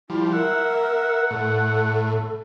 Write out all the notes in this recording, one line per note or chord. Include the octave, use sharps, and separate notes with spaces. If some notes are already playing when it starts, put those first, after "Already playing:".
F3 G3 E4
A#4 E5 F#5
A2 A4